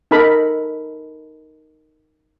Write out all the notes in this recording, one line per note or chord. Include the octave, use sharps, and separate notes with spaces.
D#4 A4 A#4 B5